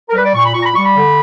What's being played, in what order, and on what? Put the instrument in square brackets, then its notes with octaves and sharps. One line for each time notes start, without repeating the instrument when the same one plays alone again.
[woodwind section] A#4
G3 B4
D5
A#2 C#6
B5
A#2 C#6
A#5
B5
G3 C#6
B5
D3